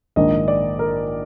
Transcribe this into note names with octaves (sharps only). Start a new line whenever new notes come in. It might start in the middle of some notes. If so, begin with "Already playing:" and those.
A#1 G#2 D#3 A#3 D4 D#5
D5
A#4